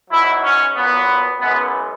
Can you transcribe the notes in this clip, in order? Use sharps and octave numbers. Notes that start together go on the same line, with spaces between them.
G#2 F#3 E4
C#4
A#2 F#3 B3
F#2 C#3 E3 G#3 B3